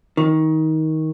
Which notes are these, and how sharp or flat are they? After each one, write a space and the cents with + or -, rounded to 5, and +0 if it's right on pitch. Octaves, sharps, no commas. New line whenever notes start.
D#3 +20